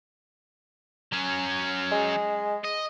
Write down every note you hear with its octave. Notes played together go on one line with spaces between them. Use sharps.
F#3 C#4
G#3
D#5